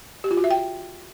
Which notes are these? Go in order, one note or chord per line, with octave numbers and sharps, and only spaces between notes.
G4
F4
F#4
E5
G5